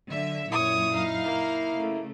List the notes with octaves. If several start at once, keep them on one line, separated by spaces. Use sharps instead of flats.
D3 F#3 E5
F#2 A#2 E4 C#5 D#6
D#4 F5
A#3
C#3 A3